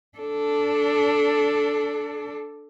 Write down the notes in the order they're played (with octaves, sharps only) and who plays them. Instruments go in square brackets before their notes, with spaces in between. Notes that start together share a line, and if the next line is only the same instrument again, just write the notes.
[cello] D4 A4